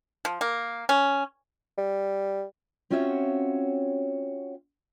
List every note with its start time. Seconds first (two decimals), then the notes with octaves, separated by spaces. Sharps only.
0.25 F3
0.41 A#3
0.89 C#4
1.78 G3
2.90 C4 C#4 F4 F#4 C#5 E5